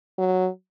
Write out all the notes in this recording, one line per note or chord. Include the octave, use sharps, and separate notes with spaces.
F#3